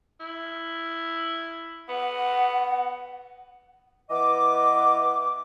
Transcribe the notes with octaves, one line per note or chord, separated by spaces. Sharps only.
E4
B3 F#5
E3 B3 D#5 D6